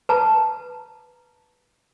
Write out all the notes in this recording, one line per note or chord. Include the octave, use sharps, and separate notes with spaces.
B4 A5 A#5